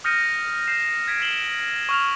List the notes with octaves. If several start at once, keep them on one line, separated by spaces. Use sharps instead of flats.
D#6 F6 G6 A#6 C#7 D#7
G6 C7 E7
G#6 B6 D7
E6 B6 C7 E7 F#7 G7
C#6 F6 F7